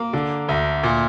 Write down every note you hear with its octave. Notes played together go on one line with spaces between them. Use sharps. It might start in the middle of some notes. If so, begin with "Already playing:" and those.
Already playing: A#3
D3
D2
A#2